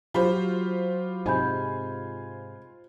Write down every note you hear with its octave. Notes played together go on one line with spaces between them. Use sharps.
F#3 F4 G4 C5 B5
G#2 C3 D#5 G#5 B5 G6